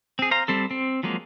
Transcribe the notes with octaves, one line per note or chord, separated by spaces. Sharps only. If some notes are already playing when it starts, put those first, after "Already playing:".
C4 G#4
C5 F5 A#5
G3 C4 A4
C4
F3 F#3 G#3 A#3